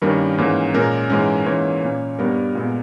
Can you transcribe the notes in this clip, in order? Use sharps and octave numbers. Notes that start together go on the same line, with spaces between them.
G2 D#3 G3 A#3 C#4 A#4
G#2 E3 A#3 C#4
A#2 G#3 C#4 A#4
G#2 E3 G#3 C#4
G#2 E3 A#3 C#4 C#5
A#2 A#3 C#4
G2 G3 B3 A#4
A#2 G#3 B3